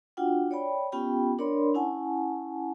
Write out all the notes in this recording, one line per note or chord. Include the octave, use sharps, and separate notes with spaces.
D4 F4 F#4 F#5 G5
C#5 D5 G5 B5
B3 C#4 F4 G4 G5 B5
D4 A#4 C#5 D5 B5 C6
C#4 E4 F#5 G#5 A5